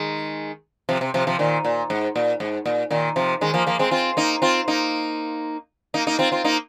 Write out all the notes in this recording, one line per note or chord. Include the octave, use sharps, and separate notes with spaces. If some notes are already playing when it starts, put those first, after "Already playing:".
Already playing: D#3 G#3
C3 F3
C3
C3 F3
C3 F3
A#2 D#3
A#2
G#2
A#2
G#2
A#2
A#2 D#3
C3 F3
D#3 G#3
F3 A#3
F3 A#3
G#3 C4
C4 F4
A#3 D#4
C4 F4
A#3 D#4
A#3 D#4
A#3 D#4
C4 F4
C4 F4
A#3 D#4